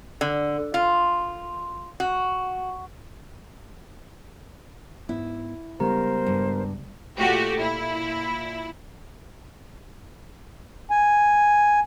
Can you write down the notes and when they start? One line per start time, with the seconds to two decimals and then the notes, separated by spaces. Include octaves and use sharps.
0.21 D3
0.74 F4
2.00 F#4
5.09 G#2 B3 E4
5.80 C#3 G3 G#3 B3 G4 A#4 C5 A#5
6.26 G2
7.18 A#2 A3 F#4 G4
7.56 A#2 E4
10.91 G#5